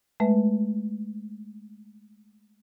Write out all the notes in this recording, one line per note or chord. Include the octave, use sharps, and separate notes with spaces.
G#3 A3 B4 E5